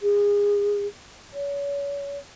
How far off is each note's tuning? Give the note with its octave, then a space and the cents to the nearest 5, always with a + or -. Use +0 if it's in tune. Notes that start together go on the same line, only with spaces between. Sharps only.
G#4 -25
C#5 +35